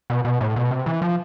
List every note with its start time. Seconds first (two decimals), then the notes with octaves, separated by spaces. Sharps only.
0.10 B2
0.25 B2
0.41 A2
0.56 B2
0.71 C3
0.86 E3
1.02 F3